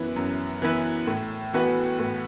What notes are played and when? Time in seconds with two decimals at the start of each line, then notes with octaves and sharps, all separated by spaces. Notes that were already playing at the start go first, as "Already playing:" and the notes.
Already playing: F#2 E3 B3 E4 B4
0.16 F#2
0.62 E3 B3 E4 B4
1.07 A2
1.54 E3 B3 F#4 B4
1.99 A2